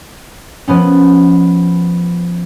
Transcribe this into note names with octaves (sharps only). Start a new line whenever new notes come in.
F3 B3 C#4